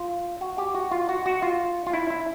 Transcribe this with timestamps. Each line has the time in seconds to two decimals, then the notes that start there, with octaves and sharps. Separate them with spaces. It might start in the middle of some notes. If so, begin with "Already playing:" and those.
Already playing: F4
0.41 F#4
0.58 G4
0.75 F#4
0.92 F4
1.09 F#4
1.26 F#4
1.43 F4
1.87 F4
1.93 E4
2.10 E4